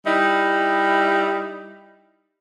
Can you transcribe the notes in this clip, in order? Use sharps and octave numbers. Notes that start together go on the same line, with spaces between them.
G3 D#4 E4